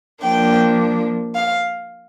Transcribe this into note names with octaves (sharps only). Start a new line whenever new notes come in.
F3 A#3 D4 G5
F5